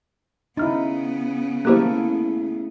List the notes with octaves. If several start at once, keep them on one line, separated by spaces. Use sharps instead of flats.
C#3 B3 D#4 E4 F6 A6
F3 A3 A#3 E4 G4 G#4 A#4 F#6